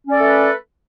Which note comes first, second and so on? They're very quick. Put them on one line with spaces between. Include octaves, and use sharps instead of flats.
C#4 D5 A4 A3 B4